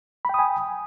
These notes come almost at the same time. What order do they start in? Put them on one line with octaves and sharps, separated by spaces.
B5 G5 D#6 G#5